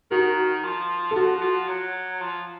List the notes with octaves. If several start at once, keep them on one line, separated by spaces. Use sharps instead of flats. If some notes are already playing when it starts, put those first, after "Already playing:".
D#3 F#4 A#4
F3
A4
F3 F#4
F3
F#3
F3